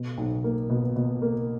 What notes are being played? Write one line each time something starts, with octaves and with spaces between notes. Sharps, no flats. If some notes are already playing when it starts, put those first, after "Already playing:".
Already playing: B2
B1
A#3
B2
B2
A#3